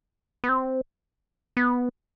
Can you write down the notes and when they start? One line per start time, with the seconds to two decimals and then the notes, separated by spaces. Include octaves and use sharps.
0.44 B3
0.49 C4
1.57 B3